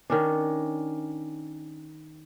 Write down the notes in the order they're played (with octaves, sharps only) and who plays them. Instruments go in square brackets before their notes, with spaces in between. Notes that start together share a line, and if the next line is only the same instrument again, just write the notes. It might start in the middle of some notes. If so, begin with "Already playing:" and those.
[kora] D#3 C#4 D4